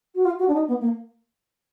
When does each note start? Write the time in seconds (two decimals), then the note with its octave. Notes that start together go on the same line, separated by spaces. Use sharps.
0.15 F#4
0.24 F4
0.39 F#4
0.48 D4
0.53 D#4
0.67 B3
0.80 A#3